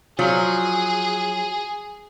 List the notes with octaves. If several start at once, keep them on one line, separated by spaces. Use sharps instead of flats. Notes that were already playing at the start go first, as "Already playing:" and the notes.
F3 F#3 G#4